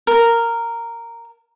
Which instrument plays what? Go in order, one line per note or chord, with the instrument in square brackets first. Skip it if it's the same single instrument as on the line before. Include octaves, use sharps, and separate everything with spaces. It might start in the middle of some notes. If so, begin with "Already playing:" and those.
[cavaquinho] A#4